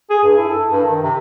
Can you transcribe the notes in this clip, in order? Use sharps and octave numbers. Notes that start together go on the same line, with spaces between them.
G#4
G2
E4
A4
G2
D#3
C3